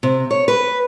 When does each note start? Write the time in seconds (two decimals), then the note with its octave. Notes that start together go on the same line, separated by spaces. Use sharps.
0.03 C3
0.31 C#5
0.48 B4